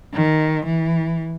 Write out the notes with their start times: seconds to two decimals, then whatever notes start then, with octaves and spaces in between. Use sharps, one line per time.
0.14 D#3
0.66 E3